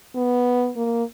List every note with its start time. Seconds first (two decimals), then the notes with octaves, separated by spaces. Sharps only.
0.15 B3
0.76 A#3